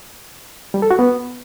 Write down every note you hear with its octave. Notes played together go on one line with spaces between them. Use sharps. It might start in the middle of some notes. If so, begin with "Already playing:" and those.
G3
A4
F#4
B3